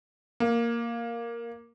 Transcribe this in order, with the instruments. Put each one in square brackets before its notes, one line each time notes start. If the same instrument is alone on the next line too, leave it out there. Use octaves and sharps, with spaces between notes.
[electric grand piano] A#3